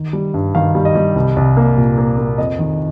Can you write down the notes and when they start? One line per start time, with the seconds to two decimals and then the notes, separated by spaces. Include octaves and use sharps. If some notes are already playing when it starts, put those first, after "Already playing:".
Already playing: D#3
0.13 G3
0.34 G2
0.55 D#3 F5
0.75 G3
0.85 D#5
0.95 G3
1.15 C2
1.36 C2
1.57 A#3
1.77 A#2
1.98 A#3
2.18 A#3
2.38 F2 D#5
2.59 D#3